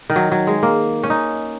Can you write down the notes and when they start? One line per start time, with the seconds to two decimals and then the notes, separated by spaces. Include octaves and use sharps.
0.10 D#3
0.16 F#3
0.32 F#3
0.47 G#3
0.63 A#3
1.03 C#4
1.10 D#4